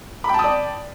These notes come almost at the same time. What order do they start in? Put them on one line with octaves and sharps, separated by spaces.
B5 G5 A5 D#6 D5